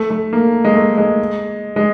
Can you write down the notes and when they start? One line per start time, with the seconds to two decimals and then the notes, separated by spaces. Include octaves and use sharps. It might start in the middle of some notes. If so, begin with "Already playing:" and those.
Already playing: A3
0.10 A3
0.33 A#3
0.65 G#3
0.75 A3
0.98 G#3
1.76 G#3